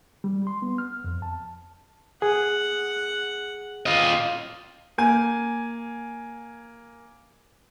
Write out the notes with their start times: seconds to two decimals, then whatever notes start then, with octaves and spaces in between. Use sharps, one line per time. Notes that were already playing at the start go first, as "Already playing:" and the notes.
0.24 G3
0.47 C6
0.62 B3
0.78 F6
1.04 F2
1.22 A5
2.22 G#4 F#5
3.86 F4 D#5
4.98 A#3 G#5